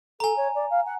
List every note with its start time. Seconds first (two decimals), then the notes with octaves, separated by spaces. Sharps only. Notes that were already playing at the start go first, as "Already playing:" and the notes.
0.20 A4 G#5 A#5
0.36 C#5
0.55 D5
0.70 F5
0.86 F#5